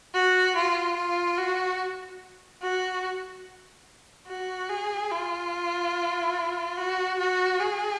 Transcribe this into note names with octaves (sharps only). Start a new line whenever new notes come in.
F#4
F4
F4
F#4
F#4
F#4
G#4
F4
F#4
F#4
G#4